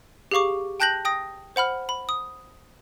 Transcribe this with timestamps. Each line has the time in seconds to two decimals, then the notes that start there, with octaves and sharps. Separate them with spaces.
0.31 G4 G#4 F5 C#6 D6
0.80 G5 A5 F#6 G6 A#6 F#7
1.05 G5 D#6 A#6
1.56 C5 F#5 B5 F6
1.89 B5
2.09 D#6